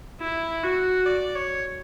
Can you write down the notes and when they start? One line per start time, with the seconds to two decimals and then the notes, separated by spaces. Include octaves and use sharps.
0.20 E4
0.64 F#4
1.06 D5
1.35 C#5